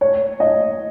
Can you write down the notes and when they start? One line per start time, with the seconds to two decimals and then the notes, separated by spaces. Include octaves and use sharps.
0.01 C#5
0.40 D#5